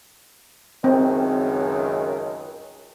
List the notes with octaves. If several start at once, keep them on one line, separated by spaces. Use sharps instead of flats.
C#2 F#2 D#3 C4